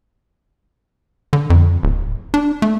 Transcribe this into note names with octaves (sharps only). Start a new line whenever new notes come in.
D3
F2
D1
D4
A3